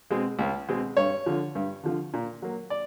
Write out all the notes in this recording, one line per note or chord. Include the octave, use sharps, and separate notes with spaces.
B2 G#3 C4
C#2
B2 G#3 C4
G2 C#5
D3 F3
G2
D3 F3
A#2
F#3 A#3
D5